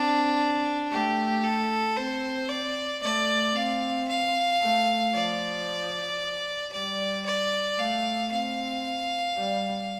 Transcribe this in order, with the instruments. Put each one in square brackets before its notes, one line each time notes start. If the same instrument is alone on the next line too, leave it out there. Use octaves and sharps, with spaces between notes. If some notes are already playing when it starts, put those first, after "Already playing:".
Already playing: [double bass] C4 [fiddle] D4
[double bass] A3 [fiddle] G4
[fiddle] A4
[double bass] C4 [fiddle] C5
[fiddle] D5
[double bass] A3 [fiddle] D5
[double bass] C4 [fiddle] F5
[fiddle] F5
[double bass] A3
[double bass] F3 [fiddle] D5
[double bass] G3 [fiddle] D5
[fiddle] D5
[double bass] A3 [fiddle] F5
[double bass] C4 [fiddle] F5
[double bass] G3